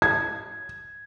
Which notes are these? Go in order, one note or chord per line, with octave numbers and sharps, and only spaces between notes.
G#6